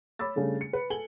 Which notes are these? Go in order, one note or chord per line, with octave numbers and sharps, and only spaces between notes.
C#5 B5 D6 E6 A6
C#3 G3 A3 D4
C#7
B4
A4 G#5 F#7 G7